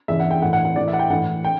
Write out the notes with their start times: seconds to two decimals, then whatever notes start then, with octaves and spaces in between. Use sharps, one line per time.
0.08 E2 C#3 E3 E5
0.20 F#5
0.31 G5
0.42 A2 E3 F#5
0.53 F#5
0.65 F#5
0.76 A2 E3 D5
0.88 E5
0.93 F#5
0.99 G5
1.10 A2 E3 F#5
1.44 G5